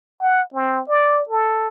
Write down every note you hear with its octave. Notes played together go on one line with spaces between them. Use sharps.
F#5
C4
D5
A4